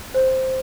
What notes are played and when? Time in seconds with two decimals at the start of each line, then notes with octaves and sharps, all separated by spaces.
0.14 C5